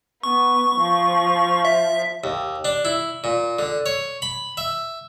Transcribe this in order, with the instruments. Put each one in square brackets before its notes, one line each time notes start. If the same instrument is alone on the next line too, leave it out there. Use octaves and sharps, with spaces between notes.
[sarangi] B3 [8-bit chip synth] C#6
[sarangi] F3
[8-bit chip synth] E5
[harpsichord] D#2
D4
E4
A#2
D3
C#5
B5
E5